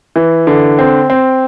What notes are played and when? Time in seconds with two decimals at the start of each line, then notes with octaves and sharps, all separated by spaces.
0.16 E3
0.47 D3
0.79 C4
1.10 C4